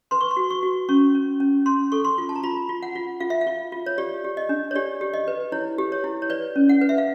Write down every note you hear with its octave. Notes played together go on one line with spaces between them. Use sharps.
B4 C6
C#6
C6
F#4
C#6
F#4
C#4 C#6
C#4
C#4
C#4 C6
A4 C#6
C6
F4
A5
A#5
F4 B5
F4
F#5
F4
F4 F5
E5
F5
F4
F4
C#5
G4 D5
G4
D#5
D4
C#5
G4 D5
G4
D#5
B4
E4 C#5
G4
C#5
E4
C#5
B4 D5
C#4
F#5
B4
E5
F5